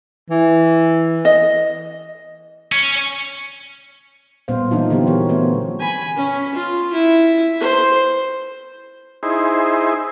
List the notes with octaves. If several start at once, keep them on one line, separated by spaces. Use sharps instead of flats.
E3
D#5
C#4
A#2 G3 B3 C#4 C5 F5
E3 F#3 A#3 D4 D#4 F4
D3 F#3 B3 F4 G4
E3 A#4 C#5
A#2 E3 A3 B3 C4
G#5 B5
C#4
F4
E4
C5
D#4 E4 G#4 C5